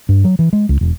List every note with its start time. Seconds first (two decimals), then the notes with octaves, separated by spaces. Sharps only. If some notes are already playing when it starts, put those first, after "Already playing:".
0.09 G2
0.24 F#3
0.39 E3
0.53 G#3
0.69 C#2
0.81 E1